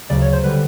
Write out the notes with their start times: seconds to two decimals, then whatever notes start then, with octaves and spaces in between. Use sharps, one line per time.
0.10 D2 C#3 F#3 D5
0.22 C#5
0.33 C5
0.44 D3 G3 B4